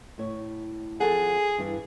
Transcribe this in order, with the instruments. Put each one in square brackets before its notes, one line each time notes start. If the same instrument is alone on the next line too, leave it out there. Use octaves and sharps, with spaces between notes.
[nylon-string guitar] A2 C#5
[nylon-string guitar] F2 A4 F#5 [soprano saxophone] G#4
[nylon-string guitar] G2 E3